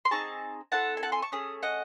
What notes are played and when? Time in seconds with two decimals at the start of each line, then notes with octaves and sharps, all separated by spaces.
0.05 C6
0.11 C4 D#4 G#4 A5 C#6
0.72 C4 E4 A4 F#5 A5
0.97 G#5
1.03 F#5 A5
1.12 G#5 C6
1.22 A5 C#6
1.32 A3 C#4 G#4 D#6
1.63 D#5 F#5